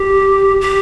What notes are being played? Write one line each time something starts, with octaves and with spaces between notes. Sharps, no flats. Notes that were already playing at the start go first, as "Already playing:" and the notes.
Already playing: G4
G4